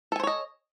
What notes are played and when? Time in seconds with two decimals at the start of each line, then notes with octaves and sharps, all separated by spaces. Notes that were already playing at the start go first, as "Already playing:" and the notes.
0.12 A4
0.16 G#5
0.20 C5
0.23 C#5
0.27 D#5